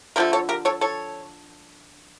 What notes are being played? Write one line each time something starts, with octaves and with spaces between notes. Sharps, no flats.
D3 F3 A3 G4 A#4
A4 C#5
G4 A#4
A4 C#5
A4 C#5